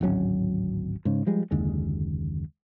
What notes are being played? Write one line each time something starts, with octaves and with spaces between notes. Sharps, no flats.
D1 G#1 F#3 C#4
G#2 C#3
F3 G3 G#3
F#1 D#2 D3 G#3